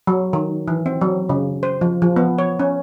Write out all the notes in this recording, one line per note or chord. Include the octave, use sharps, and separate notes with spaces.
F#3
D#3
E3
C4
F#3
C#3
C5
F3
F3
B3
C#5
C#4